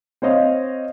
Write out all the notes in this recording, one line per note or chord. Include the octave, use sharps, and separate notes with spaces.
C4 C5 C#5 D#5 F5